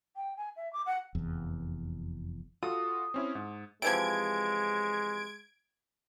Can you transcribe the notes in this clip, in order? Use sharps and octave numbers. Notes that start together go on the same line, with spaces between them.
G5
G#5
E5
D6
F#5
F1 E2
F4 F#4 A4 D#6
C4 C#4 E4
G#2
C3 E3 F3 G#3 G#6 D7